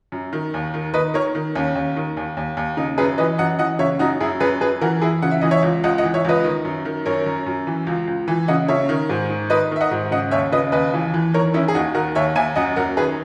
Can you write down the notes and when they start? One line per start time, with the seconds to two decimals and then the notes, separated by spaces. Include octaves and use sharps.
0.12 F#2
0.33 D#3
0.54 D#2
0.74 D#3
0.94 D#3 B4 D#5
1.14 D#3 A#4 C#5
1.35 D#3
1.55 D#2 C#4
1.75 D#2
1.96 D#3
2.17 D#2
2.37 D#2
2.57 D#2
2.77 C#3 D#4
2.98 F#2 G#4 B4
3.18 E3 B4 D#5
3.38 F#2 D#5 F#5
3.59 E3 D#5 F#5
3.79 C#3 C#5 E5
3.99 F#2 D#4 F#4
4.20 F#2 E4 G#4
4.40 F#2 G#4 B4
4.61 F#2 G#4 B4
4.81 E3 F#4 A#4
5.01 E3 E4 G#4
5.22 C#3 F#5
5.31 E5
5.41 E3 D#5
5.51 C#5 E5
5.62 C#2
5.84 C#2 D#5 F#5
5.98 D#5 F#5
6.04 E3
6.14 C#5 E5
6.25 C#2 B4 D#5
6.44 D#3
6.65 F#2
6.85 D#3
7.06 F#2 A#4 C#5
7.26 F#2
7.46 F#2
7.67 E3
7.87 C#2
8.07 C#2
8.28 E3
8.48 C#3 D#5 F#5
8.68 C#3 C#5 E5
8.89 D#3
9.09 G#2
9.30 D#3
9.50 D#3 B4 D#5
9.71 D#3 E5
9.81 D#5 F#5
9.91 G#2
10.11 C#3 D#5 F#5
10.31 D#2 C#5 E5
10.52 C#3 B4 D#5
10.72 D#2 B4 D#5
10.94 E3
11.14 E3
11.34 D#3 A#4 C#5
11.54 D#3 C#4 E4
11.68 G#4
11.75 D#2 D#4 F#4
11.94 D#3 F#4 A#4
12.15 D#2 C#5 E5
12.36 D#2 E5 G#5
12.56 F#2 D#5 F#5
12.76 F#2 F#4 A#4
12.97 D#3 G#4 B4